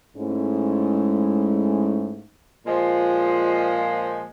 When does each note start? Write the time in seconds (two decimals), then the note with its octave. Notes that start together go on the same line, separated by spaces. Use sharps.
0.17 G#2 G#3 A3 C#4 E4
2.66 A#2 F3 G#3